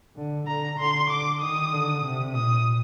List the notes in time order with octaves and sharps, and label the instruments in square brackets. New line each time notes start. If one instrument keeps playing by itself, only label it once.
[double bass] D3
[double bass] D3 [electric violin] A#5
[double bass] D3 [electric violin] C6
[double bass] D3 [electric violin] D6
[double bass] D#3 [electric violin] D#6
[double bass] D3
C3
[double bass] A#2 [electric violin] D#6